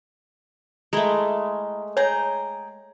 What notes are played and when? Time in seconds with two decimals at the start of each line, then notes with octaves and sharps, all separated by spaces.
0.93 G#3 A3 E4 A#4
1.97 G#4 C#5 G5 A#5